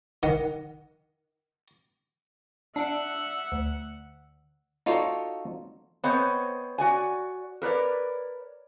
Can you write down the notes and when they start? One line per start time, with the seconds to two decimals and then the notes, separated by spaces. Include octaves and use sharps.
0.23 D#3 F#5
2.76 D4 E5 F#5
3.52 D2
4.86 D#4 F4 F#4 A4 C#5 D5
6.03 B3 C4 C5 C#5 D#5
6.78 F#4 D5 G#5
7.62 A#4 B4 C#5 D5